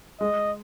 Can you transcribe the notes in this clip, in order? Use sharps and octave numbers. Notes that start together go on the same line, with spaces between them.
G#3 D#5